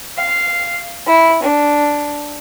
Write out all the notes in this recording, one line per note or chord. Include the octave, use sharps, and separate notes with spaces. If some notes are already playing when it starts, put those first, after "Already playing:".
F5
E4
D4